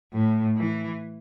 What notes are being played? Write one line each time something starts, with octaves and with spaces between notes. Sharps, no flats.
A2
E3